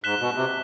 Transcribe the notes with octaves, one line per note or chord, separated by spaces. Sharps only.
G#2 F#6 B6 E7 G7
B2
C3